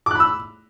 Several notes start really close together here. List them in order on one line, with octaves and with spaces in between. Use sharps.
D6 F#6 B5 E6